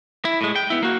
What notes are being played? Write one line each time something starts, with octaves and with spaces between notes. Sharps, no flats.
E4
A2 G#3
G5
B3 E4
A#3 F#4